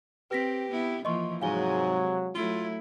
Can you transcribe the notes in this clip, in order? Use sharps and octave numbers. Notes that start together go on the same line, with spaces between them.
C4 G4 B4 A#6 B6
B3 E4
E3 F3 A#3 D#5 C6 C#6
G#2 C3 F#3 G#3 F5 G#5 G7
F#3 A3 E4 F4